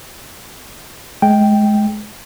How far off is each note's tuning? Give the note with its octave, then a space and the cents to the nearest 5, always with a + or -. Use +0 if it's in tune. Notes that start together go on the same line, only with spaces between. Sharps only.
G#3 +25 G5 +0